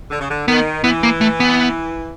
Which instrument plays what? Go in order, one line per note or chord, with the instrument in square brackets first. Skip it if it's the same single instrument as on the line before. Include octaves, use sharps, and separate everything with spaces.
[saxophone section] D3
C#3
D3
[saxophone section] D#3 [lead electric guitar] B3
[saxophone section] E3 [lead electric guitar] B3
[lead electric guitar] A#3
A3
B3